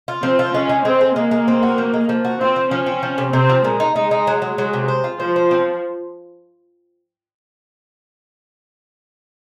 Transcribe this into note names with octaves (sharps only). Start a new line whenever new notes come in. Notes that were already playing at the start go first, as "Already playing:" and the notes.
F4
F3 C4
F4
G#3 C#4
G#3
G#3 C4
G#3
G#3 A#3
G#3
C4
F#4
F3
G#3
F3
F#4
C4 F4
F3
F3 C#4
C4
F3
C3
C3 C4
F3
A#2 G#3
D#4
G#3 D#4
D#4
F#3
F#3
F#3 G#3
C3
C5
F4
F3 C5
C5
C4